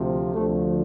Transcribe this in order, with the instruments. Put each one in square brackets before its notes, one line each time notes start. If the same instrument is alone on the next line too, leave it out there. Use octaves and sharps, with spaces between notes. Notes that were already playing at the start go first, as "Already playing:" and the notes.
Already playing: [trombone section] D2 C3 F3
D2 D3 F3 A3